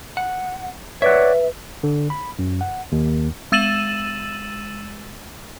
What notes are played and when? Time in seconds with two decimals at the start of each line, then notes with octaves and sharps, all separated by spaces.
0.17 F#5
1.02 B4 C#5 D5 E5 F#5
1.83 D3
2.10 B5
2.39 F#2
2.61 F#5
2.92 D#2
3.52 G#3 E6 A6 D#7 E7 F#7